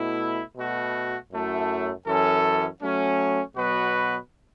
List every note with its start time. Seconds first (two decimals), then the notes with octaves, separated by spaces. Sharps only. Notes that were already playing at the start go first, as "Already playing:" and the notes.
Already playing: B2 A3 E4
0.56 B2 A3 F#4
1.31 F#2 F#3 A3 E4
2.06 F#2 E3 C#4 A4
2.82 F#3 A3 C#4
3.57 B2 F#3 B3 F#4 B4